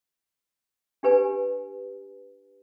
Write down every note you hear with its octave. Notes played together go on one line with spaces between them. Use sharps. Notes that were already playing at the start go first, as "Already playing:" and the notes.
D4 G4 B4 G#5